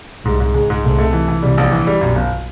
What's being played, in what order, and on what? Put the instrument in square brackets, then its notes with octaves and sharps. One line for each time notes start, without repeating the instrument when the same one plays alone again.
[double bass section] C2 C3 [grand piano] G#2
[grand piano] G#2
[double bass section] C#2 C#3 [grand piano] G#3
[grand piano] G#2
[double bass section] C2 C3 [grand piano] A3
[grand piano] A3
E3
E3
[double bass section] C2 C3 [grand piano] G3
[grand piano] A#1
E3
G3
[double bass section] B1 B2 [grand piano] F#2
[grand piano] G1